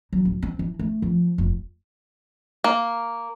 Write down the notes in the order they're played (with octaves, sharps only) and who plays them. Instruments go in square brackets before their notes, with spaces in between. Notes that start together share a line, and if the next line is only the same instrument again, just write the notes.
[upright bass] F#3
D1
C4
E3
A3
F3
F1
[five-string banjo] A#3